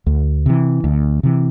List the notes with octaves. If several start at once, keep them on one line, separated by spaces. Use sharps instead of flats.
D2
C3 E3
D2
C3 E3